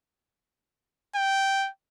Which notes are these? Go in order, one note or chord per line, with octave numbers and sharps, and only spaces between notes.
G5